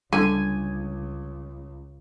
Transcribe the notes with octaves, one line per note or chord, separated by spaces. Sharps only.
C#2 D3 G3 G#5